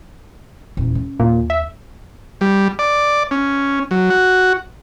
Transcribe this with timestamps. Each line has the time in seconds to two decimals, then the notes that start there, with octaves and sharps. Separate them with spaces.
0.77 D#1 E2
0.95 C#4
1.19 D#2 A#2
1.50 E5
2.41 G3
2.79 D5
3.31 C#4
3.91 F#3
4.10 F#4